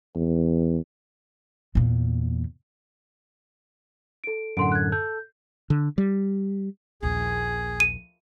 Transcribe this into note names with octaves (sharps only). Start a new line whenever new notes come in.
E2
E2 A#2
A4 D7
F#2 A2 D3 F#5 C6 D7
F#6 G#6
A4 G6
D3
G3
A#1 D#2 G#4
D#7